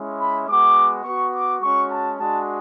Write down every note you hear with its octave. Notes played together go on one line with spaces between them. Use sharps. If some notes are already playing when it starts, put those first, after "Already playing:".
Already playing: G#3 C#4 E4
B5
G#3 B3 F#4 D6
B3 F#4 C#6
D6
G#3 C#4 F#4 C#6
A5
G#3 D4 F#4 A5